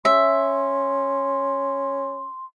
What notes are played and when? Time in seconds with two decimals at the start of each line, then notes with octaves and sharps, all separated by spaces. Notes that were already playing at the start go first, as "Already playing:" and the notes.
0.05 C#4 E5 C6